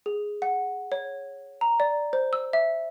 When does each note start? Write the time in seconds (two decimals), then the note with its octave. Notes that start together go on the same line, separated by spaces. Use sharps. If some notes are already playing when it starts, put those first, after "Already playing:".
0.06 G#4
0.42 F#5
0.92 C#5
1.61 A#5
1.80 D5
2.13 C5
2.33 E6
2.53 E5